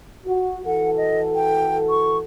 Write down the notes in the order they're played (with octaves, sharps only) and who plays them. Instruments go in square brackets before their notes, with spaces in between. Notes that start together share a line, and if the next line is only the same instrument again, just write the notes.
[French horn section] F#4
[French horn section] E3 F#4 A4 [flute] F#5
[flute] D#5
G5
C#6